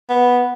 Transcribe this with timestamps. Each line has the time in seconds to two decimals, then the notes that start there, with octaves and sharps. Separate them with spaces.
0.10 B3